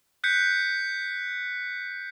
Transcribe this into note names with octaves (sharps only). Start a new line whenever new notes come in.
F#6 G6 B6 C#7